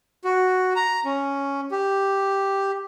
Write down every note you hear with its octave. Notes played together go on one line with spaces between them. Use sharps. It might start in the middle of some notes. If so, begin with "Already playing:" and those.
F#4
A#5
C#4
G4